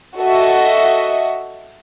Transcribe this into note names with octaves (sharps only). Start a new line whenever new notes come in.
F#4 A4 D#5 E5